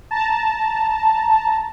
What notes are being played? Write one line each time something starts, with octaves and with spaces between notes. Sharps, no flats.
A5 A#5